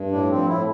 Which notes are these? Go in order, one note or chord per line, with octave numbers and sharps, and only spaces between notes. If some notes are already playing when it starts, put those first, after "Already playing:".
Already playing: G2
A2 D4
F3 C4
A2 E4